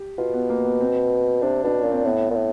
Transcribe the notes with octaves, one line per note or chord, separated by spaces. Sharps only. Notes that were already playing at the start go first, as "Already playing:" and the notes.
Already playing: G4
B2 F4
B3
A#3
B3
C4
C3 D4
B2 D4
A#2 C#4
C4
A2 B3
A#2
A2